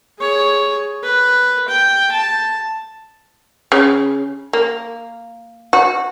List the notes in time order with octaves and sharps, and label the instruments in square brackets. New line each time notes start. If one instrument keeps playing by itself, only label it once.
[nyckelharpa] G#4 C#5
B4
G5
A5
[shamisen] C#3
A#3
F#4